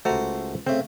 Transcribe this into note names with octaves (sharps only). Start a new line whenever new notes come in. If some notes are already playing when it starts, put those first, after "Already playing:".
C#2 A3 F#4 C5 A#5
C#3 A3 C4